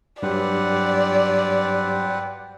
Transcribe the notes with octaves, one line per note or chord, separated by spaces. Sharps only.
G2 F#3 C4 G4 B4 D5 F#5